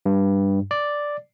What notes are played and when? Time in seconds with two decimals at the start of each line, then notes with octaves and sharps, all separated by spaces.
0.06 G2
0.71 D5